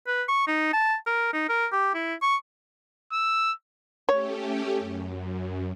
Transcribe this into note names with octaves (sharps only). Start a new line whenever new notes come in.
B4
C#6
D#4
A5
A#4
D#4
A#4
G4
E4
C#6
E6
A3 C#4 G4 C#5
F#2